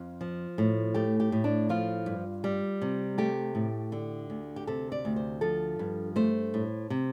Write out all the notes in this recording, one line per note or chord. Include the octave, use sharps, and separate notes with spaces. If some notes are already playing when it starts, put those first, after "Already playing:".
Already playing: F2 F4
F3
A2
A3 G4
G4
A2
D4
F3 F4
G2
G3
C3
A3 G4
A2
D3
D2
G4
C3 A4
D5
D2
C5
F3 A4
G2
A3 C5
A2
C3